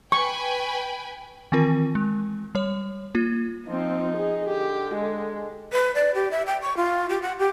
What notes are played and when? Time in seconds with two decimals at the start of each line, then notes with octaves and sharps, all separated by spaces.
0.12 B4 G5 G#5 C#6
1.52 D#3 E3 C4 F4 A#4
1.95 G#3
2.55 G3 C#5
3.15 A#3 F4
3.68 F3 C4 D#4
4.16 G#4
4.49 D3 G4
4.95 G#3
5.72 B4
5.95 D5
6.15 G4
6.31 E5
6.46 G5
6.62 C#6
6.77 F4
7.09 G4
7.22 F#5
7.39 G4